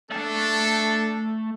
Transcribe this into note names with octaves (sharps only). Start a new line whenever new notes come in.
A3 D4 A4 A5